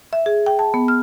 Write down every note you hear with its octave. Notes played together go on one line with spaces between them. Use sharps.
E5
G#4
G5
A5
B3
F6